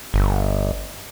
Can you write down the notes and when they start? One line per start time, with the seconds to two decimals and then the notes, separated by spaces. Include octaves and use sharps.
0.14 G1